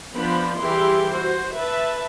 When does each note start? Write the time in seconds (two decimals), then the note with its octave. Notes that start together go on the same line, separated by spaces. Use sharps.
0.15 F3 B3 D4 C5 B5
0.58 E3 G3 E4 G4 G#4 C6
1.14 F#4 C5
1.59 B4 E5 A5